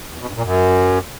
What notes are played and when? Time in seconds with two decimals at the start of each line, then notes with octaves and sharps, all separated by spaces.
0.13 E2
0.20 B2
0.28 G2
0.36 A#2
0.43 F#2